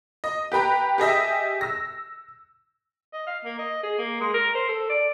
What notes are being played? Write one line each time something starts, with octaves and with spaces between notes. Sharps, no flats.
D#5
G4 B4 G5 A#5
G4 G#4 D#5 E5
E6 A#6
D#5
F5
A#3
D#5
G#4
A#3
G#3
A#4
C5
A4
D5